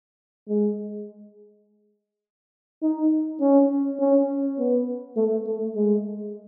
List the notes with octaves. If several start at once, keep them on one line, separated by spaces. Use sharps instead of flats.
G#3
D#4
C#4
C#4
B3
A3
A3
G#3